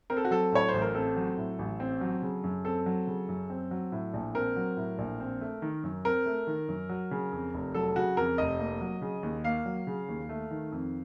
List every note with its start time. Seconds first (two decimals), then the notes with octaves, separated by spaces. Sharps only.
0.10 C4 A#4
0.17 A4
0.25 F#4
0.31 F#3 A4
0.52 A2 C#5
0.69 C5
0.74 A1
0.82 A#4
0.95 C4 A4
1.16 F#3
1.38 A2
1.59 A1
1.80 C4
2.01 F#3
2.22 C#3
2.44 F#2
2.65 C4 A4
2.86 F#3
3.07 C#3
3.28 F#2
3.50 C4
3.71 F#3
3.92 A2
4.13 A#1
4.35 C4 A#4
4.56 F#3
4.77 A2
4.98 A#1
5.20 C4
5.41 A3
5.62 D#3
5.83 F#2
6.05 C4 A#4
6.26 A3
6.47 D#3
6.68 F#2
6.89 F#3
7.11 C#3
7.32 F2
7.54 F1
7.74 F#3 A4
7.96 C#3 F#4
8.17 F2 A#4
8.38 F1 D#5
8.59 A#3
8.81 F#3
9.02 C#3
9.23 D#2
9.44 A#3 F5
9.66 F#3
9.87 C#3
10.08 D#2
10.29 A3
10.51 D#3
10.72 F2